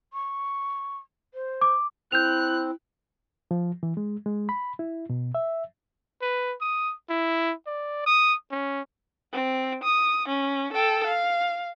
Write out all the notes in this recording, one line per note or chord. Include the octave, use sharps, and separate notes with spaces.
C#6
C5
D6
C4 E4 F#6 G6 F7
F3
E3
G#3
G#3
B5
E4
B2
E5
B4
D#6
E4
D5
D#6
C#4
C4
D#6
C#4
A4 G5
F5